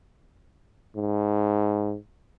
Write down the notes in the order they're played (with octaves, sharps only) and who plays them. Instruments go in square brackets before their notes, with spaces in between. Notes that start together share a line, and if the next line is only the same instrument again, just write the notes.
[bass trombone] G#2